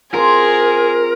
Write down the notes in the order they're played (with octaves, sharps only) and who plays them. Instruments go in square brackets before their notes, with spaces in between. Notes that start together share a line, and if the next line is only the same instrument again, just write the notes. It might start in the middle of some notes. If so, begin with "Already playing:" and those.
[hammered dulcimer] C4 F4 [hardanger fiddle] G#4 [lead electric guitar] A#4